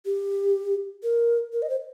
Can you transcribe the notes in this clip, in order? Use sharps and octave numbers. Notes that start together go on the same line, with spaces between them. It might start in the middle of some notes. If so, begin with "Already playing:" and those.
G4
A#4
A#4
D#5
C5